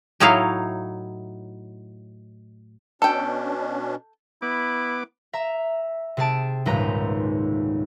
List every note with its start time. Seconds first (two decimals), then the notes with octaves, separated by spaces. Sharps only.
0.20 A2 F#3 D#4 E4 C#5 F5
3.02 B2 C#4 D4 A4 G5
4.42 B3 E4 D6
5.33 E5 A#5
6.17 C3 G#4 A5 D7
6.66 D#1 C#2 G#2 D#4 B4 A#5